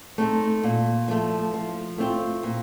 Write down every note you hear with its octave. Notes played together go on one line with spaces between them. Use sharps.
A3 C4 D#4
A#2
F3 A3
F3
A3 C4 F4
A#2